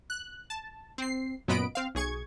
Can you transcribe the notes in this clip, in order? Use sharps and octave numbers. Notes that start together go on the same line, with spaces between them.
F#6
A5
C4 C7
F#2 A#2 B3 D#5 B5 D7
C4 F5
B1 G#4 C#6 G#6